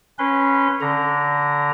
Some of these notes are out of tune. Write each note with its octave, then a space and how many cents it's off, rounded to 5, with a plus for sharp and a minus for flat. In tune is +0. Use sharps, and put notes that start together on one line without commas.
C#4 -15 B4 -15 C6 -30
D3 -15 A#5 +0